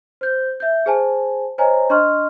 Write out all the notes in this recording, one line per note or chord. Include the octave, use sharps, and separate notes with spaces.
C5 G6
E5 G6
G#4 C5 G#5 A5
C5 C#5 D#5 G#5 A#5
D4 D#5 C6 C#6 F6